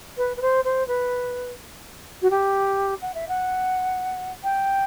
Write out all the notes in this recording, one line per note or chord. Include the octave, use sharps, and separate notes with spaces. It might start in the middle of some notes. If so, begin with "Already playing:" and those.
B4
B4
C5
C5
B4
F#4
G4
F#5
E5
F#5
G5